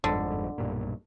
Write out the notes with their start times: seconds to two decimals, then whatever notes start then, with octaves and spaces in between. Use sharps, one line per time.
0.04 G1 F2 G#2 D3
0.58 B1 G2 A#2